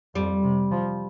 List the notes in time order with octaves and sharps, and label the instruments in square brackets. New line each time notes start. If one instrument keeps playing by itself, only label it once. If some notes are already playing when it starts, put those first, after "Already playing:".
[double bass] F2 [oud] G3
[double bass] C3
F3